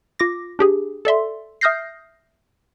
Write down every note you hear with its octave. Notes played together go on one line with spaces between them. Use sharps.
F4 D6 A#6
D4 G4 G#4
A4 D5 E5 C6
E5 D#6 F6 G6 A#6 C7